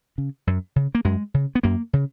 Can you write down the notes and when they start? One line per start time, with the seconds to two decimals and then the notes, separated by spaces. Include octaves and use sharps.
0.18 C#3
0.47 F#2
0.76 C#3
0.95 A#3
1.05 F#2 G#3
1.34 C#3
1.55 B3
1.63 F#2 A#3
1.93 C#3